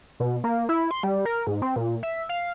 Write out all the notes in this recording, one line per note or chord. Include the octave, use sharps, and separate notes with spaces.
B2
A#3
E4
C6
G3
A#4
G#2
C4
A#2
E5
F5